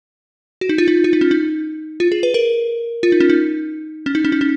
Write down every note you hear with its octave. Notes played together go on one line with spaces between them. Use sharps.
F#4
D#4
F4
D#4
F4
D#4
C#4
D#4
F4
G#4
B4
A#4
F4
D#4
C#4
D#4
C#4
D#4
C#4
D#4
C#4